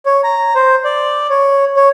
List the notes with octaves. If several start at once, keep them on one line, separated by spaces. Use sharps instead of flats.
C#5
A#5
C5
D5
C#5
C#5